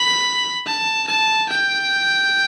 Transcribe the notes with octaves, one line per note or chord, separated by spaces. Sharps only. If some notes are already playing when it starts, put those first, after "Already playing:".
Already playing: B5
A5
A5
G5